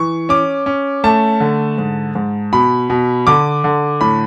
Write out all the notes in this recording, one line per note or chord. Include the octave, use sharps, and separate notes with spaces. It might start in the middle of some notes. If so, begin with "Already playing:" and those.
Already playing: E3 C#6
C#4 D6
C#4
A3 A5
D3
G#2
G#2
B2 B5
B2
D3 D6
D3
A2 B5